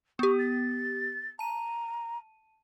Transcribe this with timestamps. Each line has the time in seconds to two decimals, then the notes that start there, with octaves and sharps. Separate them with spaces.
0.19 B3 G4 C#6
0.38 A6
1.39 A5 A#5 D#7